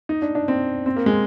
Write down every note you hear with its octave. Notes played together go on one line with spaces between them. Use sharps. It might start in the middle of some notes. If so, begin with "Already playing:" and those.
D#4
D4
D4
C4
C4
A#3
G#3